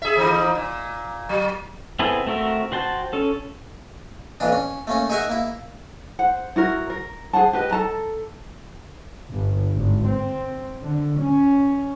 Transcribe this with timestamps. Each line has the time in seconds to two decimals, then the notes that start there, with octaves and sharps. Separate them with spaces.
0.02 G#4 E5
0.16 F2 E3 D#4
0.55 A#2
1.29 F#3
1.99 B3 C4 E4 G#4 A4
2.26 A3 C4 F#4 A#4 E5
2.72 F#4 C5 G5 A5
3.13 C#4 A4
4.40 F2 A#2 E3 D4
4.52 C#4
4.87 A3 A#3 C#4
5.10 D#4 G#4 A#4 E5 F#5 G#5
5.30 A#3 E4
6.19 C5 F#5
6.56 E4 F#4 A#4
6.90 A#4
7.33 G#4 C5 F#5 A5
7.53 G4 B4 D#5
7.71 A4 A5 A#5
9.30 G1
9.75 G#1
10.07 C4
10.82 D3
11.21 C#4